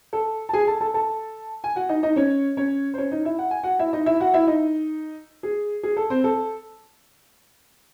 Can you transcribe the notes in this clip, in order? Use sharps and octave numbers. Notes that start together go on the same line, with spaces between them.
A4
A5
G#4 G#5
A4 A5
A4 A5
A4 A5
G#5
F#4 F#5
D#4 D#5
D#4 D#5
C#4 C#5
C#4 C#5
C5
C#4 C#5
D#4 D#5
E4 E5
F#5
G#5
F#4 F#5
E4 E5
D#4 D#5
E4 E5
F#4 F#5
E4 E5
D#4 D#5
G#4
G#4
A4
C4 C5
A4